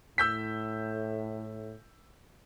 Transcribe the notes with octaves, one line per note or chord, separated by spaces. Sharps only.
A2 E6 G6 B6